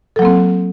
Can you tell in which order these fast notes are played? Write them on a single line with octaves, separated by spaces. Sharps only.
A4 F#3 A#3 C4